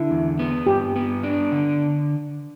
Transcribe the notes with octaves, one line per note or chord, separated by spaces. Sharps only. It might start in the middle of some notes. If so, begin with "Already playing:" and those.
Already playing: D3 E4
E2
B3
G2 G4
B3
D4
D3